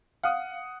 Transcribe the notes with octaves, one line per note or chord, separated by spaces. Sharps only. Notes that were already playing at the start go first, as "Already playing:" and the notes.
F5 F#5 D#6